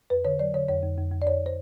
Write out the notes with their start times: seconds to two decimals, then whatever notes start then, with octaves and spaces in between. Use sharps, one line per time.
0.10 F2 B4
0.25 D3 C#5
0.39 F#3 D5
0.54 D3 C#5
0.68 F2 C#5
0.83 F2
0.98 F2
1.11 F2
1.22 D5
1.26 F2 C#5
1.46 C5